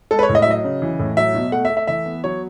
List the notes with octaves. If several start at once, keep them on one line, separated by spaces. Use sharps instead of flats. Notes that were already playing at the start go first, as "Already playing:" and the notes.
G#3 A4
B4
C#5
A2
D#5
E5
F#3 D#5
C#3
E3
A2
F#3 E5
B2
A3 F#5
E5
A3
E5
E3 E5
B3
F#3 C#5